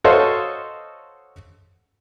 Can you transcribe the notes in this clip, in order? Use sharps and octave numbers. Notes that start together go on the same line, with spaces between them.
F#4 A4 C5 C#5 D#5 F5